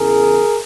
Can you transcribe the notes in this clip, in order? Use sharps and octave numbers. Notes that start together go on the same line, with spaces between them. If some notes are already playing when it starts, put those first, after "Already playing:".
Already playing: E2 C#3 E3 G#4 A#4